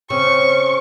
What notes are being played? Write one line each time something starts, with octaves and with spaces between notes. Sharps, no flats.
C#3 C4 C5 C#6